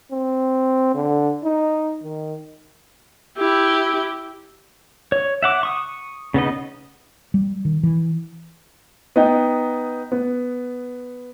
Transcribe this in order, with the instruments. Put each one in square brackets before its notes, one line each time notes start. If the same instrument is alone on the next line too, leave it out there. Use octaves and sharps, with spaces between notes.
[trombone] C4
D3
D#4
D#3
[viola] E4 G4
[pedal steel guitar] C#5
E5 F#5 D6
C#6 D#6
C#3 B3 D#4 D#5
[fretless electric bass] G3
D#3
E3
[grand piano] B3 D#4 G5
B3